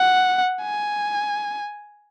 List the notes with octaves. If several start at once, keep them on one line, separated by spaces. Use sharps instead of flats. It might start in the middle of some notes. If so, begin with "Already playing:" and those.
Already playing: F#5
G#5